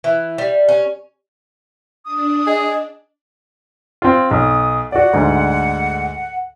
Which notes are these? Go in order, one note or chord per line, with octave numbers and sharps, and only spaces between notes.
E3
G3
C#4
D4 D#6
G#4 D#5
C4 F4
B1 D#6
F#4 D5 F#5
D2 G#2 D3